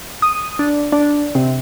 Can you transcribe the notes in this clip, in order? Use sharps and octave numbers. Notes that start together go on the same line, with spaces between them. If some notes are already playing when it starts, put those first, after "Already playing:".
D#6
D4
D4
C3